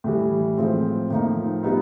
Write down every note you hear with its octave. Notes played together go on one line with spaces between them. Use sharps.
A2 E3 G3
A2 F3 G#3 C4
A2 F3 A#3 D#4
G3 B3 D#4